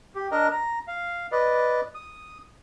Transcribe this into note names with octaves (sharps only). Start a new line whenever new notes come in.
G4
D4 A#4 D#5 A#5
A#5
F5
B4 D5 D#5
D#6